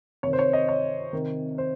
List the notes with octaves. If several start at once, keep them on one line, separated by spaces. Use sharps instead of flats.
C3 D#3 C#5
C5
C#5
D#5
C#5
C3 D#3
C5